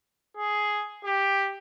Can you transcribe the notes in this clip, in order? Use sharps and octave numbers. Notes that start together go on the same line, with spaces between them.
G#4
G4